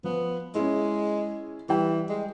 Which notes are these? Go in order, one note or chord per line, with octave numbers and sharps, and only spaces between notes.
F3 B3
G#3 C#4 E4
E3 G3 G5
G#3